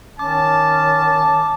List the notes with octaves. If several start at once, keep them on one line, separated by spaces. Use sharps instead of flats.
D#3 C#4 A5 D6